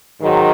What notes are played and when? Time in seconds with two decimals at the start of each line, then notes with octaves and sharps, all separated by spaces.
0.22 G#2 D#3 F#3